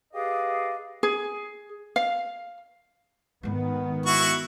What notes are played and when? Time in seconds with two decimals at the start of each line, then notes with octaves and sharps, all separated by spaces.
0.14 G4 G#4 B4 D5 D#5 F5
1.03 G#4
1.96 F5
3.43 G#2 D#3 G#3 B3
4.06 E4 F#4 C#6